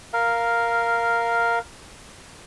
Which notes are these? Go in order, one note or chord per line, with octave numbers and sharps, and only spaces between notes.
A#4 F5